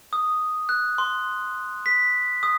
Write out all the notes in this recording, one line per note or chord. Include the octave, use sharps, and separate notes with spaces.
D#6
F#6
C6
B6
D#6